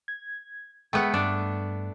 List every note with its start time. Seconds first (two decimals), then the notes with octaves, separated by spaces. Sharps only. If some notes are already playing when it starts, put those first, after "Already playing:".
0.08 G#6
0.93 G#3 A3 B3 G5
1.14 G2 D4